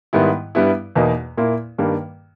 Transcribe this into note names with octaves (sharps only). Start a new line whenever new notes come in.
G#2 D#3 G3 B3 E4
G2 G3 B3 E4
E2 B2 A#3 D#4
A#2 A#3 E4
G2 D#3 G3 A#3